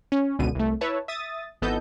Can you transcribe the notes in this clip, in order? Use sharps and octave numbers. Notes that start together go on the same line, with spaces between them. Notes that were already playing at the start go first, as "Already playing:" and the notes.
C#4
G#1 C#2 B2 D3 D#7
C2 A3
E4 B4 C#5 E5 A5
E5 D#6 A6
G#1 E3 B3 A4 D#5 G6